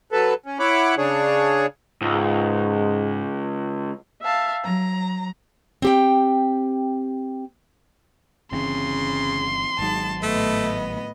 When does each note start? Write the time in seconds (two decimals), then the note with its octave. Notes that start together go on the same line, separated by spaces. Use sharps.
0.12 F#3 A4 B4
0.46 C#4
0.59 E4 C#5 F#5 B5 D6
0.98 C#3 D4 G#4 C#5
2.02 C#2 G#2
4.22 E5 F5 A5
4.63 F#3 A#5
5.82 C4 G4 G5
8.52 G1 C#3 E3 C4 C6
9.79 G#1 G#2 F#3 A5
10.23 A2 A3 B3 D#5